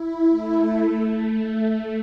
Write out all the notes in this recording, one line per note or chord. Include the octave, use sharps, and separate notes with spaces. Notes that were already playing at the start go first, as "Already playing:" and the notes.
Already playing: E4
A3
A3